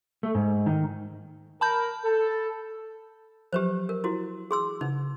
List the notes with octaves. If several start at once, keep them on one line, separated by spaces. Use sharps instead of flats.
A3
G#2
D#3
A#4 A5 B5 G6
A4
F3 F#3 G4 B4 C5
A#4
E4 F#4
G#4 C6 E6
C#3 D#4